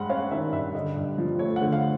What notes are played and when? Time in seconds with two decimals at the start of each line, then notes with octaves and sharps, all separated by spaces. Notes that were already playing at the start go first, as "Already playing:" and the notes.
Already playing: G2 G#3 F#5
0.09 C#4 F5
0.31 D#3 E5
0.53 G2 E5
0.75 D3 D#5
0.96 G2
1.18 F3
1.39 A3 C#5
1.56 F#5
1.62 D3
1.72 F5